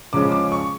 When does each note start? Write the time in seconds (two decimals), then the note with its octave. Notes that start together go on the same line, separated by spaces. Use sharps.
0.13 C#3 F3 G#3 C#4 D6
0.32 D6
0.52 C#6